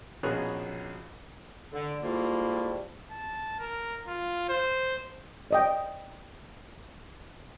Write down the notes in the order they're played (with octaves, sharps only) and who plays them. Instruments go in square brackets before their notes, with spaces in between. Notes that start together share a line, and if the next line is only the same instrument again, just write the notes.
[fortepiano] A#1 B2 C#4 G#4 A#5 F#6
[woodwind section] D3
G#2 G3 A3 A#3 E4 F4
[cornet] A5
A#4
F4
C5
[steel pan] D5 D#5 G5